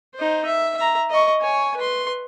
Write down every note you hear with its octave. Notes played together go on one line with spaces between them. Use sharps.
D#4 C5
E5
E5 A#5
D#5 C#6
C#5 G#5
B4 C6